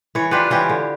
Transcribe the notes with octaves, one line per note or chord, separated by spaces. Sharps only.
E3 C#5
D4 F4 G4 B4
E3 C#4 F4 G4
D3